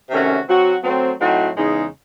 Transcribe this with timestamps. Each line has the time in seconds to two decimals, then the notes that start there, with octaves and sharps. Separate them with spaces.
0.10 C3 D#3 A3 C#4 F#4
0.48 F#3 C4 F#4
0.83 F#3 A3 C4
1.20 A2 F#3 C4 D#4 F#4
1.57 E2 C#3 G#3 D#4